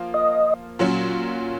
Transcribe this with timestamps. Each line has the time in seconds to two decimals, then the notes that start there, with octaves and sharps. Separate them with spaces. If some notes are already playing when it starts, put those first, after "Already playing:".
Already playing: F3 A#3 F4
0.14 D#5
0.79 A#2 F#3 C#4 F#4